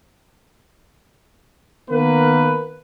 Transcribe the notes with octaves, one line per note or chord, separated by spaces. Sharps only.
D#3 A#3 B3 A#4 B4